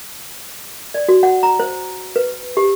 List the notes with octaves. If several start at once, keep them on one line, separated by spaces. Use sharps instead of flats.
D5
F#4
F#5
A#5
C5
B4
G4